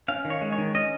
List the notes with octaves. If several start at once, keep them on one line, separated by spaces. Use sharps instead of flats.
C#4 F5
D#3
C#5
G#3
C#5
D#3
C#4 D#5